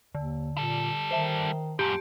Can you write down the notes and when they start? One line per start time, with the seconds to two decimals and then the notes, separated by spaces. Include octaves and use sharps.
0.15 D#2 D3
0.58 A#2 G3 A4
1.11 D#3 C5 E5 A5
1.79 F#2 A#2 G4 A5 C6